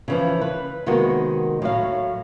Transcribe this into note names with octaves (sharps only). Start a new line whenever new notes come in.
C#3 E3 F3
B4
C3 D#3 G#3 A#3 B3 F#4
A2 F#3 F5